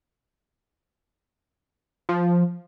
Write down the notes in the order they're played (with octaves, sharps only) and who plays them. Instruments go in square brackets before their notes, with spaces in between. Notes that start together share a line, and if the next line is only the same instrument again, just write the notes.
[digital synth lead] F3